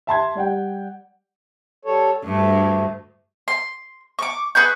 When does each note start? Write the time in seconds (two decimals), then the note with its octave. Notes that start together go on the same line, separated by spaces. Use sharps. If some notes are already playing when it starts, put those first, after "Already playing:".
0.07 E5 A5 C6 G#6
0.35 G3 D5 F#5 G5
1.85 G3 A4 C#5
2.24 D2 G2 A3
3.48 C6
4.19 C#6 D6
4.55 G#4 B4 C#6 G6